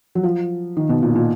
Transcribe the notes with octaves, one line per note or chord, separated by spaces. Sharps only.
F#3
F3
D#3
B2
A#2
A#2